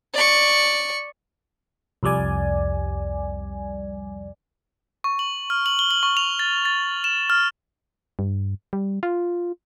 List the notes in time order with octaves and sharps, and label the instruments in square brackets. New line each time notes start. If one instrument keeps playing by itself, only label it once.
[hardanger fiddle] D5 C#6
[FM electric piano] C2 F2 G3 D5 G#5
[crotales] C#6
F#7
F6
F#7
G7
F#7
C#6
F7
A6
A6
E7
F6
[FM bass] G2
G3
F4